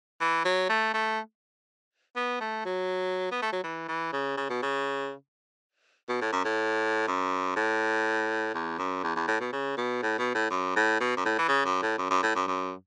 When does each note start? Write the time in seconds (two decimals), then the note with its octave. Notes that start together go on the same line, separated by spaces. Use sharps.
0.20 E3
0.45 F#3
0.69 A3
0.93 A3
2.16 B3
2.40 A3
2.65 F#3
3.31 B3
3.42 A3
3.53 F#3
3.63 E3
3.88 E3
4.13 C#3
4.37 C#3
4.49 B2
4.62 C#3
6.09 B2
6.21 A2
6.32 F#2
6.45 A2
7.07 F#2
7.56 A2
8.54 E2
8.78 F#2
9.03 E2
9.16 E2
9.27 A2
9.40 B2
9.52 C#3
9.77 B2
10.02 A2
10.18 B2
10.35 A2
10.50 F#2
10.76 A2
11.00 B2
11.17 F#2
11.25 A2
11.38 E3
11.48 C#3
11.65 F#2
11.82 A2
11.98 F#2
12.10 F#2
12.22 A2
12.35 F#2
12.47 F#2